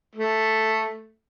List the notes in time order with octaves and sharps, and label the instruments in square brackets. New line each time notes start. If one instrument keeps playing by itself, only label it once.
[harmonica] A3